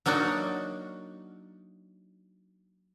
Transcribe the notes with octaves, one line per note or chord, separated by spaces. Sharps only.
F#3 A#3 D4 D#4 F#4